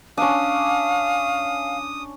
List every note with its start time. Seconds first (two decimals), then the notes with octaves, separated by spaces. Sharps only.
0.17 C#4 D4 F5 D#6